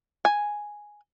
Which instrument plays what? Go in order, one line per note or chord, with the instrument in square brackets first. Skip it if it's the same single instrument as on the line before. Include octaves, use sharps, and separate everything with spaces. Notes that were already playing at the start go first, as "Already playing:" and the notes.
[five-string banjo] G#5